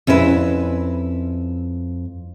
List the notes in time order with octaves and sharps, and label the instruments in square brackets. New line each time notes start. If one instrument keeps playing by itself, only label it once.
[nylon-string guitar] F2 C#4 E4 G4 B4